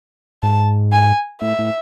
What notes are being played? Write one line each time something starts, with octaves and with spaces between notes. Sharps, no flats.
G#2 A5
G#5
A2 E5
A2